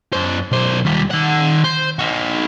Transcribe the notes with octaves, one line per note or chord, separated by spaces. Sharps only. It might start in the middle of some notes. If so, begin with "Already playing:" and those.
F#2 C5
B1 C5
D#2 G3
D#3 F#5
C5
D#4 F#4